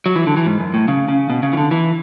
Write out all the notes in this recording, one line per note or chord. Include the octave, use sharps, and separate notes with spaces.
F#3
E3
D3
E3
G#2
F#2
A2
C#3
C#3
B2
C#3
E3
D3
E3